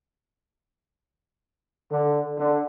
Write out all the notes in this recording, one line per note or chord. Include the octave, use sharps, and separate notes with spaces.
D3
D3